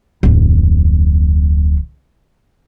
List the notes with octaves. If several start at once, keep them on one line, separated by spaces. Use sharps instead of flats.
D1 F2